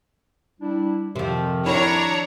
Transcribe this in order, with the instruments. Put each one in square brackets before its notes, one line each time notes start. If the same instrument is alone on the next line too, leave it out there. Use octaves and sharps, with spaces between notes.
[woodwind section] G3 D4 E4
[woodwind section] F2 D#3 [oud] C3 F3
[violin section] D4 C#5 A#5 [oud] E4